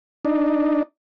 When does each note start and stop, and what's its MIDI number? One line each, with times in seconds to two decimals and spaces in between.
0.25 0.83 62
0.25 0.83 63